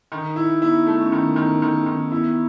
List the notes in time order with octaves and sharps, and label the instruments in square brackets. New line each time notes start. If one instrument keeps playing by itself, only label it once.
[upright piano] D#3 [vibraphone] D#4
[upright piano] E4
[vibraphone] B3 [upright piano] E4
[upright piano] A3
[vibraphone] C#4
[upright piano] D#3 [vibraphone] B3
[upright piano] D#3
D#3
D#3
[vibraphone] B3 [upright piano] E4